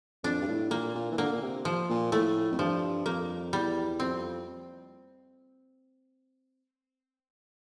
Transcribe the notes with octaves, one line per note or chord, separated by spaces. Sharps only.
F2 D4
G2
A2
A#2 A#3
A#2
E3
D3 A#3
A#2
C3
F3
A#2
A2 A3
F2
G2 F3
F2 A#3
E2 G3
F2 C4